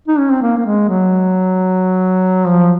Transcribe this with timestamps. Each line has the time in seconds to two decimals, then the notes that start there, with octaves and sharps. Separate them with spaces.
0.08 D#4
0.19 C#4
0.31 C4
0.42 A#3
0.58 A#3
0.66 G#3
0.88 F#3
2.47 F3